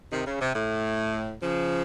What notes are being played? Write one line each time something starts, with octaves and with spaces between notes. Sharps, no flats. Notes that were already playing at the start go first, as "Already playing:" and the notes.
C3 D#3
C#3
C3
A2
C#3 F3